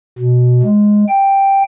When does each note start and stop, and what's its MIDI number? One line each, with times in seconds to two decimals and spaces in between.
0.19 0.62 47
0.63 1.04 56
1.08 1.63 79